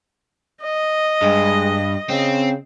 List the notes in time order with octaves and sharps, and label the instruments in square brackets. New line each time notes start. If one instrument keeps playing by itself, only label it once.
[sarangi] D#5
[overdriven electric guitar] G2 [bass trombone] G#3
[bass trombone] C#3 [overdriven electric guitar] C4